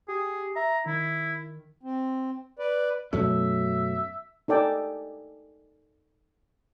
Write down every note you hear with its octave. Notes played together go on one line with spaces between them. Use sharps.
G4 G#4
E5 A#5
D#3 E4
C4
B4 D5
F#2 B2 F#3 A3 C#4 E5
D#4 A4 D5 G5 G#5